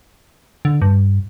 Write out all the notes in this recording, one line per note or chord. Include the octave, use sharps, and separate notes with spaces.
D3
G2